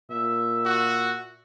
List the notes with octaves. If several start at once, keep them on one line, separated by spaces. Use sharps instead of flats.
A#2 E5
F#4